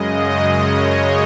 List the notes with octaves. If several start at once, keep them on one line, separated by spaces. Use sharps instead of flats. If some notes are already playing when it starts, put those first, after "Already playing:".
Already playing: F#2 C#3 G#3 D#5
C#5